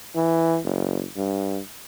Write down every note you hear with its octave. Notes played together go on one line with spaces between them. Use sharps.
E3
F#1
G2